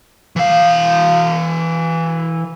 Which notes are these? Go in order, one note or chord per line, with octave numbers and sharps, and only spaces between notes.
E3 F5